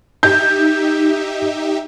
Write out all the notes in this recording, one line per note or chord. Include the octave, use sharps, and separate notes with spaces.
D#4 G4 E5 G6